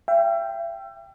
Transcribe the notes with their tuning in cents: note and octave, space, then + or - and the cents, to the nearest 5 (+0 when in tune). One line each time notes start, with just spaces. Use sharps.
E5 +40 G5 +0